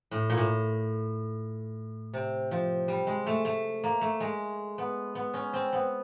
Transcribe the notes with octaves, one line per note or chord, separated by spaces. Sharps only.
A2
A#2
A2
C3
F3
G3
G#3
A3
A3
A#3
A3
G#3
B3
B3
C#4
C4
B3